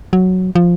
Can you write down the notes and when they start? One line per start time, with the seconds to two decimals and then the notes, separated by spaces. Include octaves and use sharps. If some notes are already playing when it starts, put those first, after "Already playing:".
0.13 F#3
0.55 F3